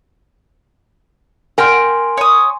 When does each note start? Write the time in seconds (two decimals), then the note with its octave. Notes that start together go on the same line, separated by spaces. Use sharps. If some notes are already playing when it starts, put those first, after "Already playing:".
1.58 A#4 G5 G#5 C6
2.17 C#5 D#6